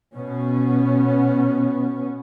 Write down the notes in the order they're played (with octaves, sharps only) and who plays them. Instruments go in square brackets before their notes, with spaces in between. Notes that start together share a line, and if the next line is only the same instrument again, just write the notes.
[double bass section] B2 B3 C#4